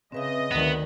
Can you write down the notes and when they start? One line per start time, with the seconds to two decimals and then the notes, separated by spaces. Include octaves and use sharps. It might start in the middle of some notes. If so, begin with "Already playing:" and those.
0.12 C#3 C4 B4 D#5 E5
0.51 D2 D#3 B3